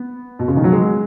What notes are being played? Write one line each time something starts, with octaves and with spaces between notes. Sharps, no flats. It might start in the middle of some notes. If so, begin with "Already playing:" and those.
Already playing: B3
B2
C#3
D#3
F#3
G#3